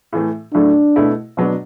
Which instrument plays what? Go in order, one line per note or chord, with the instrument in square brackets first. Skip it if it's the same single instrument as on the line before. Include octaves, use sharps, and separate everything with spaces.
[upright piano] A2 E3 A3
[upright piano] A2 F#3 A3 [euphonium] D4
[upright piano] B2 A3 E4
B2 F#3 B3 D4